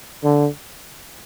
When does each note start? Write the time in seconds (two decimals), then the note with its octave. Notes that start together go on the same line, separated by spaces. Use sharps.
0.24 D3